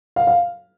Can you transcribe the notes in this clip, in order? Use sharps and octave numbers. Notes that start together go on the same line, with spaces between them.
F5
F5